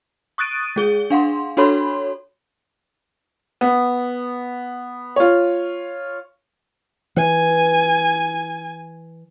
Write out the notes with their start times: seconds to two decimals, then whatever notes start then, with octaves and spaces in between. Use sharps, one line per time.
0.38 C#6 D#6 F#6 A6 D7 D#7
0.76 G#3 G#4 G7
1.10 D4 F5 F#5 C6
1.57 D4 F#4 A4 C#5 B5 C6
3.61 B3
5.16 F4 C#5
7.16 E3 G#5